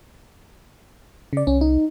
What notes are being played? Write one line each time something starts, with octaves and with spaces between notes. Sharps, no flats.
C#3 D5
C2 C#4
D#4